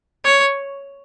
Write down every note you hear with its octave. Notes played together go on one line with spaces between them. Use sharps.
C#5